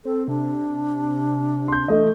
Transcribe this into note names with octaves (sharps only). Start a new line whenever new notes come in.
C4 A4
C3 D4
C6 G6
E3 A3 D#5